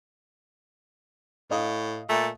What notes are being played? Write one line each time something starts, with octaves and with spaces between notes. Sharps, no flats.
A2 D#5 F5 D#6
A#2 A3